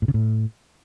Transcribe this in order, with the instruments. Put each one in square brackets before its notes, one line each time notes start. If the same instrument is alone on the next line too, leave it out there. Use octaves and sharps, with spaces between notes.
[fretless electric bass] A2
C#3
A2